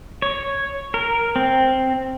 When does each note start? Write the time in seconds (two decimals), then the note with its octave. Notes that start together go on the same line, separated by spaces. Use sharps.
0.22 C#5
0.94 A#4
1.36 C4